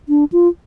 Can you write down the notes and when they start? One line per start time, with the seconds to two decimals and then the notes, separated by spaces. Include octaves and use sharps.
0.09 D4
0.32 F4